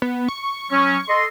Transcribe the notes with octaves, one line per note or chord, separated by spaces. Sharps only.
B3
C#6
F#3 C#4
A4 D#5 C6